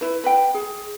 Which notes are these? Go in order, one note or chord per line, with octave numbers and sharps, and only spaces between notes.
E4 B4
B4 G5
G#4